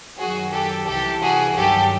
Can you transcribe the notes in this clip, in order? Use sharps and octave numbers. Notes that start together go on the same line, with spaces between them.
F#2 D#3 F#3 F#4 G#4
G4 A4
C2 C3 E3 G4 A4
F#4 G#4
G2 D#3 F#3 G4 A4